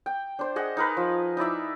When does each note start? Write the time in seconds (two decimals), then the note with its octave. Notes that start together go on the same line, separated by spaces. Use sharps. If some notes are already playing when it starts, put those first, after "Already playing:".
0.06 G5
0.39 D4 C5
0.56 G#4 D#5 F#5
0.77 D#4 A#4 B4
0.97 F3
1.37 D#4 E4 D5 E5